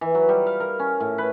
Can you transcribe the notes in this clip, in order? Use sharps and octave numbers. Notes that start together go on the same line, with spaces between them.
E3
F#3
G3
F5
A#4
C#4
A2
B4